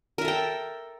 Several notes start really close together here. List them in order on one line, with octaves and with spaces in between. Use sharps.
A#4 E5 A4 G5